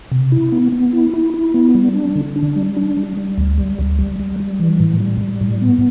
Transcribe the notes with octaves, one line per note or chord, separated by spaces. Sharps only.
C3
E4
B3
B3
E4
E4
E4
B3
G3
D4
D3
D4
G3
D4
G3
G3
D2
G3
D2
G3
G3
G3
E3
A2
G3
G3
A2
B3